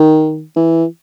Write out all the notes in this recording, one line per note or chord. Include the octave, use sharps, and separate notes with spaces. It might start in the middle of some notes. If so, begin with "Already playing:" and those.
Already playing: D#3
E3